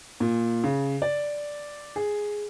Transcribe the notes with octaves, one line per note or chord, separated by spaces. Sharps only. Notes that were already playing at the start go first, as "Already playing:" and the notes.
A#2
C#3
D5
G#4